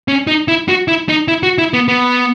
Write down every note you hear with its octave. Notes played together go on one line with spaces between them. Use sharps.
C#4
D#4
E4
F#4
E4
D#4
E4
F#4
E4
B3
B3